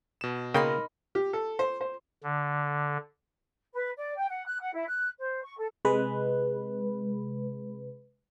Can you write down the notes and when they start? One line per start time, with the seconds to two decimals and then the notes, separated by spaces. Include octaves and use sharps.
0.21 B2 E7
0.54 C#3 A#3 D#4 A#4 G5 B5 C6
1.15 G4
1.33 A4
1.59 C5
1.81 C5
2.23 D3
3.74 B4
3.97 D5
4.17 G5
4.29 F#5
4.45 F#6
4.60 F#5
4.73 E4
4.87 F#6
5.18 C5
5.43 C#6
5.57 A4
5.85 C3 G#3 B4